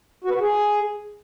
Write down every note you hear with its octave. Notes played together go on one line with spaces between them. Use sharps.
F#4
B4
F#4
G#4